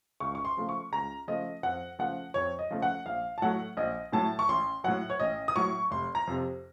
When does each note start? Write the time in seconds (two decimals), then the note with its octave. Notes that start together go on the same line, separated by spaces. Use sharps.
0.20 C#2 C#6
0.35 C#6
0.45 C6
0.57 C#3 F3 A3
0.69 C#6
0.92 C#2 A#5
1.28 C#3 F3 A3 D#5
1.63 F2 F#5
1.99 C#3 F3 A3 F#5
2.34 F2 C#5
2.59 D#5
2.71 C#3 F3 A3
2.82 F#5
3.06 A#1 F5
3.38 A5
3.42 A2 F#3 A3 F#5
3.77 A#1 D#5
4.12 A2 F#3 A3 A5
4.39 C#6
4.48 A1 C6
4.84 A2 F#3 F#5
5.10 C#5
5.20 A1 D#5
5.48 D#6
5.56 A2 F#3 C#6
5.91 F1 C6
6.15 A#5
6.27 F2 C3